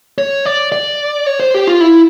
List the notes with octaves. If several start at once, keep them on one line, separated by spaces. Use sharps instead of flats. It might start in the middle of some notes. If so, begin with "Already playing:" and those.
C#5
D5
D5
C#5
C5
G4
F4
E4